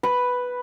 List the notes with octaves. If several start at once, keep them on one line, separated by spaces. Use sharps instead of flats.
B4